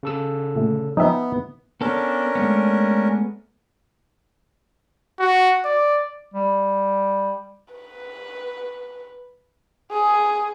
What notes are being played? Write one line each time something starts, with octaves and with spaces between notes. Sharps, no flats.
C#3 A4 E6
A#2 D3 A3
F3 B3 D#4 E5 G5 G#5
B3 C#4 D4 A4 A#4
G#3 A3 B3
F#4
D5
G3
B4
G#4